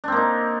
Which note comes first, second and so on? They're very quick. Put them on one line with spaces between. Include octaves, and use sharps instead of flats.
D4 C4 A#3 D#4